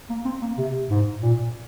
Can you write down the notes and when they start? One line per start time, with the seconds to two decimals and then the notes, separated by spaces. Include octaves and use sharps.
0.10 A#3
0.25 C4
0.42 A#3
0.58 C3
0.90 G#2
1.22 A#2